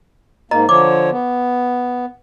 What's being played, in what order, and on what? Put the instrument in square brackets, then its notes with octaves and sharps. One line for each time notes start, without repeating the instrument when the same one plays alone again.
[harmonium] G#2 A#3 [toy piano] D#5 A#5
[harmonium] D3 F3 C#5 [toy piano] D6
[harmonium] B3